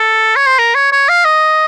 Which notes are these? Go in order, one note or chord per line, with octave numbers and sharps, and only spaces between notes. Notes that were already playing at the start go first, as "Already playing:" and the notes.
Already playing: A4
C#5
C5
A#4
C#5
C#5
F5
D#5